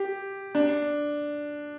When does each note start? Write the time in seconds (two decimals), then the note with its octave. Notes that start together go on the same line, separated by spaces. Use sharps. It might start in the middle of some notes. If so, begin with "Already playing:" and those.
Already playing: G4
0.55 D4